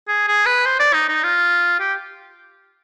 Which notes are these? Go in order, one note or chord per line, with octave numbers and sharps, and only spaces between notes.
G#4
G#4
B4
C5
D5
D#4
D#4
F4
G4